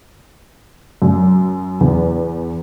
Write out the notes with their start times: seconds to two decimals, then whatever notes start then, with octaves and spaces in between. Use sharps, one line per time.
1.02 F#2
1.80 E2